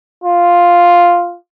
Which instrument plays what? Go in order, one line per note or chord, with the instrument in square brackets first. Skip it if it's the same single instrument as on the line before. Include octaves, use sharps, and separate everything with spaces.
[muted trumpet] F4